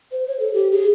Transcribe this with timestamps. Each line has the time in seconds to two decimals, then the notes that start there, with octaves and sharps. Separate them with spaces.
0.12 C5
0.28 C#5
0.40 A4
0.54 G4
0.72 G#4